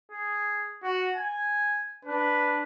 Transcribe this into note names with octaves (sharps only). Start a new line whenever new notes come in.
G#4
F#4
G#5
D4 B4